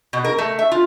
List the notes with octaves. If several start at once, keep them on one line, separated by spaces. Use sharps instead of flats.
B2
A#4
A3
E5
F4